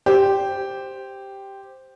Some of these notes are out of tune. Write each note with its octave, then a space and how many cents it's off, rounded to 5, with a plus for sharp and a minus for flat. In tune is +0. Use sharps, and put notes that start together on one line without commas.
G4 +0 C5 +0